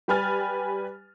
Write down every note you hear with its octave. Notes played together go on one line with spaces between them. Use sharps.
G3 G4 B4 G#5 F6 A6